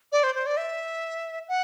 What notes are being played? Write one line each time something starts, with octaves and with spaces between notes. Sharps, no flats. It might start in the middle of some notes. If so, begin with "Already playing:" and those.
D5
C5
C5
D5
E5
F#5